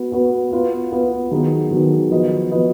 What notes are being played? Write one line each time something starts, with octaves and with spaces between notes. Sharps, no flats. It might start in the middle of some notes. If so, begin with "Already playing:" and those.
Already playing: B3 F#4 B4
B3 F#4 B4
B3 F4 B4
B3 F4 B4
D#3 F#3 B3 D#4 G#4
D#3 F#3 B3 D#4 G#4
F3 B3 F#4 B4 D#5
F3 B3 F#4 B4 D#5